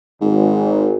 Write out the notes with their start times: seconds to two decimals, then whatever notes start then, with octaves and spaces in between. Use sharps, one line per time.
0.21 G#1 G#2